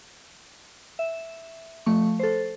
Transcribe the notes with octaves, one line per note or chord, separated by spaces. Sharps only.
E5
F3 A3 C#6
A4 C5